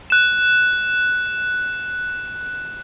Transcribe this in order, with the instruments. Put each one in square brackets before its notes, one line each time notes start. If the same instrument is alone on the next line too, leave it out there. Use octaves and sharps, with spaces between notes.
[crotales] F#6 E7